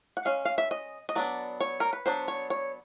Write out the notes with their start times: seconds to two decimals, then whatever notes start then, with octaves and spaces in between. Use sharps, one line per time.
0.17 F#5
0.25 G#3 C#4 F5
0.45 F5
0.58 E5
0.71 D#5
1.09 D#5
1.15 F#3 B3 D4 D5
1.61 C#5
1.80 A#4
1.93 B4
2.06 F#3 B3 D4 C5
2.28 C#5
2.50 C#5